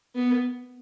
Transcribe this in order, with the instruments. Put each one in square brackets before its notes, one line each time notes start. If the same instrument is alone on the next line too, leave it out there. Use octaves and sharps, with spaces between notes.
[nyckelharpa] B3